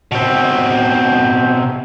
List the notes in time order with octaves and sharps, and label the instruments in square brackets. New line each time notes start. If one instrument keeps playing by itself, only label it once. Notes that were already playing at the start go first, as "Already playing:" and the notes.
[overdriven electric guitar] B2 C4